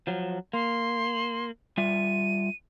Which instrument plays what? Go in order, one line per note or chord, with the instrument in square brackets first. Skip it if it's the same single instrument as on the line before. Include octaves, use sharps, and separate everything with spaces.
[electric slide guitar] F3 F#3
[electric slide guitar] A#3 [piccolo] C6
[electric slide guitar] G3 F4 E5 [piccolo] D#7